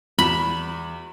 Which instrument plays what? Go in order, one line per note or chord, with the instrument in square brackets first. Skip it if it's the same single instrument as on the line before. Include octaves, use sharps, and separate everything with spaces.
[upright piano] E2 F#4 E7 [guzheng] B5